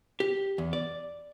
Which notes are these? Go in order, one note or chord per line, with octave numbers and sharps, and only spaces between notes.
G4
E2
D5